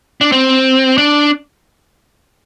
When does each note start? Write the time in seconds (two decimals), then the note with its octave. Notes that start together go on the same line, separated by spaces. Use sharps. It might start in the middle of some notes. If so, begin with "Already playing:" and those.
0.21 D4
0.32 C4
0.98 D4